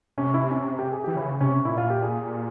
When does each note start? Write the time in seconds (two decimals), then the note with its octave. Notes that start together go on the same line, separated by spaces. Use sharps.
0.18 C3 C#4
0.34 E4
0.51 C#4
0.79 G4
0.92 G#4
1.04 E3 G4
1.16 C#3 E4
1.40 C3 C#4
1.65 A#2 E4
1.78 F4
1.90 G4
2.02 G#4